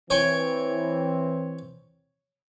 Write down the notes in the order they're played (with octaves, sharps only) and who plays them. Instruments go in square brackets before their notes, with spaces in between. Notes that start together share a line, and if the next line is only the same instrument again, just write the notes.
[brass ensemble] E3 C4 [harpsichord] C#5 G5 G#5